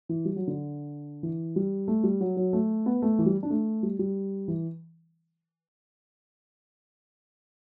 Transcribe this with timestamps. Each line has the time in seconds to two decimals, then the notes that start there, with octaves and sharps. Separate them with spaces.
0.09 E3
0.25 G3
0.36 F#3
0.47 D3
1.23 E3
1.56 G3
1.88 A3
2.04 G3
2.21 F#3
2.37 F#3
2.53 A3
2.86 B3
3.02 A3
3.19 E3
3.26 G3
3.43 D4
3.50 A3
3.83 G3
3.99 G3
4.48 E3